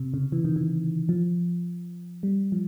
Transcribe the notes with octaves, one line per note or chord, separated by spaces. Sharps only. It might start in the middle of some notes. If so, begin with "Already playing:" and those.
Already playing: C3
C#3
E3
D#3
E3
F3
G3
F3